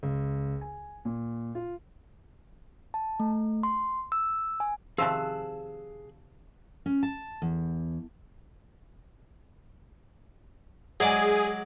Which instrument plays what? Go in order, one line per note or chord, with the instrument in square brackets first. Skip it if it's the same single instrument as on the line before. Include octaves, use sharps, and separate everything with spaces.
[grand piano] C#2
G#5
A#2
F4
[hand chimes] A5
A3
C6
E6
G#5
[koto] C3 D#3 F3 [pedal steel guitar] G#4 F#6 [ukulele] F5 A5 [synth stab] E6
[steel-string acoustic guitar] C#4
A5
E2
[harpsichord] F#3 G#3 D5 [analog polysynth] G#4